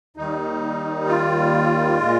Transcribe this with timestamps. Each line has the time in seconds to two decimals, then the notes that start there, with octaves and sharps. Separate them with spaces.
0.17 D#2 D#3 G3 D#4
1.07 F4
1.98 A#2 G#3